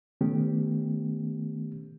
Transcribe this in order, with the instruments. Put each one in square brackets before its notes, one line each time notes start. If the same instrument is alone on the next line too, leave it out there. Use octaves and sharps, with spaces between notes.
[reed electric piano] D#3 A3 B3 C#4 G4